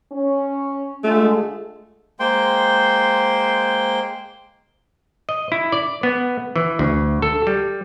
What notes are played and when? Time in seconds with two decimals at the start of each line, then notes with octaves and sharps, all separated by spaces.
0.13 C#4
1.04 D3 G#3 A3 F4
2.20 G#3 A#3 C5 G5 C6
5.29 D#5
5.52 E4
5.72 D5
6.03 B3
6.56 E3
6.79 D2
7.22 A4
7.47 G3